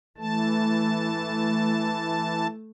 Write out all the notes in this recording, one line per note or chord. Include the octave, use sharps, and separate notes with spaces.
E3 A3 A5